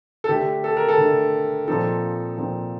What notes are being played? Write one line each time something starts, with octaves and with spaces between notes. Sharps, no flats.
A4
D3 A3 D4 G4
A4
A#4
A4
D3 A3 D4
A#2 F3 C4 D#4 A4
A#2 F3 C4 D#4